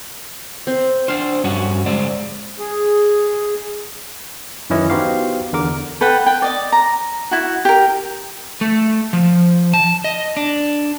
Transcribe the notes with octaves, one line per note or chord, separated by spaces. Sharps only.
C4
D4 C5 F5
G2 C#4 F#4
G#3 C5 D5
G#4
F#2 D#3 E3 C#4 E4 D#5
B3 D#4 F#4 G4 C5 F5
E2 D3 A#4 D6
A4 B4 F#5 G5
B4 G5
D5 D#5
A#5
E4 F#4
G4 A#4
A3
F3
A5
D#5
D4